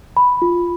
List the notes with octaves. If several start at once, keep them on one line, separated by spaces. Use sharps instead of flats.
B5
F4